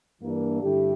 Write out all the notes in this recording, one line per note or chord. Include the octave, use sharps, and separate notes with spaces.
G2 E3 A#3 D4
G2 D3 A3 E4 G4